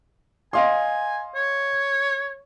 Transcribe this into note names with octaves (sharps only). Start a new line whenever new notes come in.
D#5 F5 G#5 C6
C#5